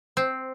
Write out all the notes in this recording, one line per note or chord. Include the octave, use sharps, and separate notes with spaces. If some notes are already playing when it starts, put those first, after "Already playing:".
C4